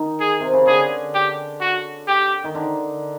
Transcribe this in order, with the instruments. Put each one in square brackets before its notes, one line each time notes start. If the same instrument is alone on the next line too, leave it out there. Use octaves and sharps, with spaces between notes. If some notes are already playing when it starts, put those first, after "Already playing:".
Already playing: [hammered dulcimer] D#3
[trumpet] G#4
[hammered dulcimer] C3
C#3
[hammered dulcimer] D3 [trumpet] G#4
[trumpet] G4
F#4
G4
[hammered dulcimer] D#3
D3